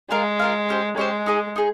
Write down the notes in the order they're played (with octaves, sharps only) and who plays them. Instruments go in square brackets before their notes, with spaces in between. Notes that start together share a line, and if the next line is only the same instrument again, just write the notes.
[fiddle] G#3 [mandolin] F4 A#4 F5
[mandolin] F4 A#4 F5
C#4 G4 C5
[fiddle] G#3 [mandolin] C#4 G4 C5
[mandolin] D#4 G#4 D#5
D#4 G#4